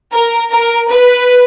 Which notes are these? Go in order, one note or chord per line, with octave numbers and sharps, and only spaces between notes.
A#4
A#4
B4